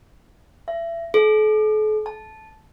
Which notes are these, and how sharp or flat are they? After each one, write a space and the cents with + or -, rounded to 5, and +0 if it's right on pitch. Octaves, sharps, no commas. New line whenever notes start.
E5 +30
A4 -45
A5 -10